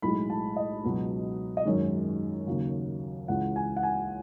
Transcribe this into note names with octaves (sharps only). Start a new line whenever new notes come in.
B1 A2 G#3 B5
A5
D#5
C#2 B2 F#3
D#5
G#1 F#2 D#3 G#3 C#5
D#2 C#3 F#3
C#2 C#3 E3 G#3 F#5
G#5
F#5
G#5